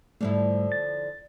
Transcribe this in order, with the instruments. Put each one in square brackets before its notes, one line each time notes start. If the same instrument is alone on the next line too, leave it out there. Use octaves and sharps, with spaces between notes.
[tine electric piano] G#2 G3 A3 [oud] D3 F3 E4
[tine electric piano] A6